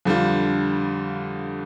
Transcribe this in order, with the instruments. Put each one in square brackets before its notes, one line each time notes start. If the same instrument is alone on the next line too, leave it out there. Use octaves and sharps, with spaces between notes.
[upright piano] F2 D3 G3 D4 F4